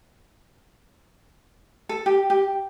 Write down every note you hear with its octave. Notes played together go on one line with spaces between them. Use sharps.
A4
G4
G4